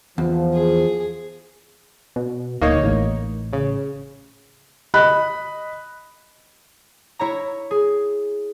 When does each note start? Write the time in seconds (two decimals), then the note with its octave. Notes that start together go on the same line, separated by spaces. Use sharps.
0.18 E2 F3
0.53 G#4
2.16 B2
2.62 D1 A#3 D#4 C#5
2.83 A1
3.53 C#3
4.94 D#5 B5 F#6
7.19 E4 C#5 A#5
7.71 G#4